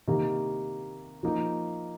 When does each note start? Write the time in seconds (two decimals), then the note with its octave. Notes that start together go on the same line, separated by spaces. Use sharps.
0.08 C3 D#3 A#3
1.23 F3 A#3 D#4